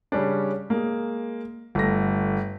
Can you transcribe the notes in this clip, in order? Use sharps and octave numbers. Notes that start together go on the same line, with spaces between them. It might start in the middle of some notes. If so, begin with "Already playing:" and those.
C#3 G3 C#4 D4
G#3 A#3
G1 A3 A#6